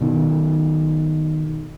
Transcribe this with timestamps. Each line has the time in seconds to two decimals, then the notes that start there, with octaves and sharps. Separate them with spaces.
0.01 B2 D#3